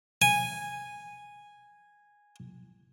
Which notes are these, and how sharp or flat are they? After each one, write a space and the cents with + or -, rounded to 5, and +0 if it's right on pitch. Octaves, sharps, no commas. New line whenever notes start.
G#5 -10